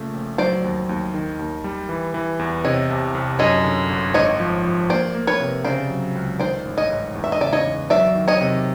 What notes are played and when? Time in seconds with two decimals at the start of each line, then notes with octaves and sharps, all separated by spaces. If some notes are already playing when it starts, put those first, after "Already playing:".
Already playing: A#2 C#3 A3
0.14 A#1
0.38 F#3 C5 D5
0.64 D#2
0.89 D#2
1.14 D#3
1.39 D#2
1.64 G3
1.89 E3
2.14 E3
2.39 E2
2.65 C3 C#5 D#5
2.90 C2
3.15 C2
3.39 F#2 C#5 D#5
3.64 D3
3.90 G1
4.14 G#1 C#5 D#5
4.40 F3
4.64 F3
4.90 A#3 C5 D5
5.15 A#3
5.27 B4 C#5
5.40 C3
5.64 C#3 C5 D5
5.90 F#3
6.15 C#2
6.40 D#3 C5 D5
6.65 A1
6.78 C#5 D#5
6.90 G#2
7.15 E2
7.24 E5
7.32 D#5
7.40 C#3 D5 E5
7.53 C#5 D#5
7.65 E2
7.90 F#3 D5 E5
8.15 D#3
8.28 C#5 D#5
8.41 C3